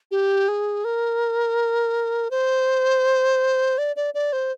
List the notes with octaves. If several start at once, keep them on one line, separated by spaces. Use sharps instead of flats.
G4
G#4
A#4
C5
D5
D5
D5
C5